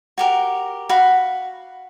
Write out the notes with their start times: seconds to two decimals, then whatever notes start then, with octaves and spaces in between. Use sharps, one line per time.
0.18 F#4 G4 A#4
0.89 F#4 F5 B5